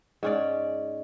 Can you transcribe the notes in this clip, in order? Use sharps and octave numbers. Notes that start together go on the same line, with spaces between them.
G#2 C#4 D5